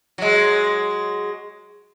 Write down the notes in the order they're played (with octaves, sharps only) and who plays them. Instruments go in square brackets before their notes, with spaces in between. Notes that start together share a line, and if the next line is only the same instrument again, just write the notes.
[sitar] F#3 G#3